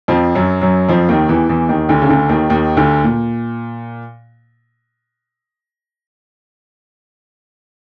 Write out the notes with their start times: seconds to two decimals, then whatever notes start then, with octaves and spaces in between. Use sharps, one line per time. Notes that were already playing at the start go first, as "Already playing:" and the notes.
0.08 F2 F3
0.35 F#2 F#3
0.61 F#2 F#3
0.89 F2 F3
1.09 D#2 D#3
1.29 E2 E3
1.49 E2 E3
1.69 D#2 D#3
1.89 D2 D3
2.02 C#3
2.09 D2 D3
2.29 D#2 D#3
2.49 D#2 D#3
2.77 D2 D3
3.04 A#2